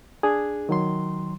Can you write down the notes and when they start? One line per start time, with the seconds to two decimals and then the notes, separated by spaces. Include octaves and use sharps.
0.23 D4 G#4
0.69 D#3 F#3 C6